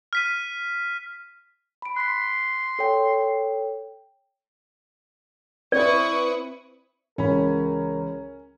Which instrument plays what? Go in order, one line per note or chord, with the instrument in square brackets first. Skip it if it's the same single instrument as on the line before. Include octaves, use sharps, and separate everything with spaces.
[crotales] F6 B6 D#7
[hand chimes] B5 D7
[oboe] C6 [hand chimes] F#6 B6
[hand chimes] A4 C#5 G5
[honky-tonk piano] C4 B4 [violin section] E4 C#6 D#6 [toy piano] D5
[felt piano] C#2 [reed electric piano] E3 B5 [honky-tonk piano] C#4 [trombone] A#4